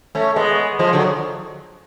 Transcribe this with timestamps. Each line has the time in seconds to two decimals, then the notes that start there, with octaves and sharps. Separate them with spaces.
0.15 A3 C#4
0.36 G#3 B3
0.79 F3 G#3
0.93 D3 F#3